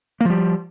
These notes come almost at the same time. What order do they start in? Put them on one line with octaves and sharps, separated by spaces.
A#3 F3 G3